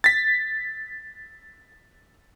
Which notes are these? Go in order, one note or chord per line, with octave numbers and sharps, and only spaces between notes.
A6 B6